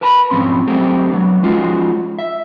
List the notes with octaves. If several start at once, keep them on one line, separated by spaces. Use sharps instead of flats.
A#4 B4 A5 B5
B1 G#2 F3 C4 C#4 C6
F#3 G3 A3 C4 G4 A#4
F#3 B3 D4
F3 G#3 C#4 D#4 F4 F#4
E5